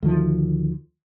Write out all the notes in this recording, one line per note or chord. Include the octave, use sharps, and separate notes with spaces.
D2 D#3 F3